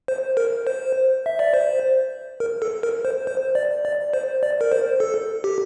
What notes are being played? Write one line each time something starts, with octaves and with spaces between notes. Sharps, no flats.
C5
A#4
C5
E5
D5
C5
A#4
A4
A#4
C5
C5
D5
D5
C5
D5
A#4
C5
A4
G4